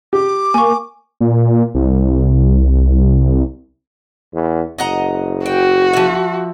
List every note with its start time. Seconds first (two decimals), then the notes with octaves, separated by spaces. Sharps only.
0.13 G4 D6
0.54 A#3 G#5 C#6
1.21 A#2
1.75 C2
4.34 E2
4.78 F#1 D#5 F#5 A#5
5.46 F#4 G5
5.93 F3 E5